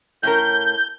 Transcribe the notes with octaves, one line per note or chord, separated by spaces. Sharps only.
A2 C#4 A#4 G6